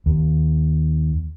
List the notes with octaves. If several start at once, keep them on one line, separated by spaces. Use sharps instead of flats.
D#2